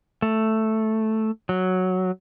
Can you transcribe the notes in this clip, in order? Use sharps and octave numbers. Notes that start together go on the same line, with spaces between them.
A3
F#3